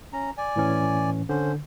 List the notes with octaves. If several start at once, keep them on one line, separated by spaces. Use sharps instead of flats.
C#4 A#5
D5 G#5
A2 E3 C#4
D3 C#4 C5